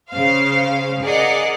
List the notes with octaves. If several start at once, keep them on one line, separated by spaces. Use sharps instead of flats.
C#3 C5 F5
G#4 A#4 D5 D#5 F#5